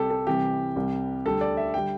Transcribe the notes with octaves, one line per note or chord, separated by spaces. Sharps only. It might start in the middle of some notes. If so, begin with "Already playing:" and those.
Already playing: C2 C3 G3 G4 A4
A4
C2 C3 E3 G3 G4
C2 C3 G3
D2 D3 G3 A4
D5
E5
D3 G3 G5